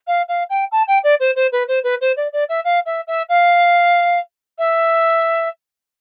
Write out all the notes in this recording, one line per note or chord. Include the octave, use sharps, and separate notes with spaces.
F5
F5
G5
A5
G5
D5
C5
C5
B4
C5
B4
C5
D5
D5
E5
F5
E5
E5
F5
E5